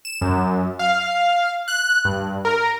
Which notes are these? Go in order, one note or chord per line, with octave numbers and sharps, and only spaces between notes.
E7
F#2
F5
F#6
G2
A#4